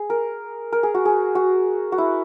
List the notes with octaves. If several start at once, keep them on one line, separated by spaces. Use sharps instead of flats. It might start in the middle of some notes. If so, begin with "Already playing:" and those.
Already playing: G#4
A#4
A#4
G#4
F#4
G#4
F#4
F#4
E4